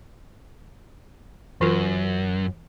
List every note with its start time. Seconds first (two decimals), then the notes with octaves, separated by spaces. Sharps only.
1.61 F#2 E3 F4 A#4